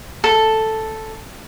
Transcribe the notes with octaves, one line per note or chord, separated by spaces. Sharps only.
A4